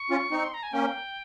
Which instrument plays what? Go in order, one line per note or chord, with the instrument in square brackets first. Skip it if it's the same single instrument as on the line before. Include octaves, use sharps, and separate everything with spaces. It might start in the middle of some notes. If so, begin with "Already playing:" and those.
Already playing: [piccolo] C#6
[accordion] C#4 F4
C4 D#4
[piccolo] C6
A#5
G#5
[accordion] A#3 C#4 [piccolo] G5